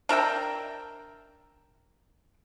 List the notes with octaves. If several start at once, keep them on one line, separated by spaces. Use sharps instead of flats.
D4 A#4 E5 G5